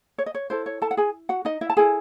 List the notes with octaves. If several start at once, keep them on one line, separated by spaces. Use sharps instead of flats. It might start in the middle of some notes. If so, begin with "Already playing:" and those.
C#5
D#5
C#5
E4 A4 C5
C#5
A4 A5
F#5
G#4 G#5
F#4 F#5
D#4 D#5
E4 E5
A5
E4 G#4 A4 G#5